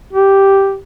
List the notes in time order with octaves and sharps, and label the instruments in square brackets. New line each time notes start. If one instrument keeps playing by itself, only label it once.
[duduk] G4